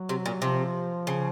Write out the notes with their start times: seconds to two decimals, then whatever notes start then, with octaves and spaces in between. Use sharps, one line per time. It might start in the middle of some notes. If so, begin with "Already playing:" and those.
Already playing: F#3
0.09 C3
0.26 A#2
0.41 C3 F3
1.07 C#3